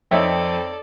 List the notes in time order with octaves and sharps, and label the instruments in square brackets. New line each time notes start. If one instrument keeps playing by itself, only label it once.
[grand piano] F2 [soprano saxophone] C4 [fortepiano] D#4 C#5 E5 [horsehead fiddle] A4 D5